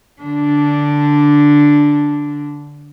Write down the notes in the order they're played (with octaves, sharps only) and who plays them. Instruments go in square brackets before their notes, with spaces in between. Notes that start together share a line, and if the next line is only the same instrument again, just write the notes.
[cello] D3 D4